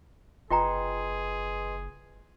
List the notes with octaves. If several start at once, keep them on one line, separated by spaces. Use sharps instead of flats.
F#1 F4 G#4 B4 D#5 G5 A#5 C6